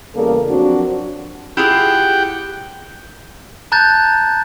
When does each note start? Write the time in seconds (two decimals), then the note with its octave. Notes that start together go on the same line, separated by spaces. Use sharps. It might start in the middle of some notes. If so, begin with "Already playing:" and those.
0.16 E2 C#3 G3 A#3 A4 A#4
0.49 F3 F#3 C4 D4 F#4
1.57 E4 F4 G4 G#4 F#5 G5
3.72 A5 A#5 F#6 G6 A6